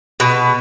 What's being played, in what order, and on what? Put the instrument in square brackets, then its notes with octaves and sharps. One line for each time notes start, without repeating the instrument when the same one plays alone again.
[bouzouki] B2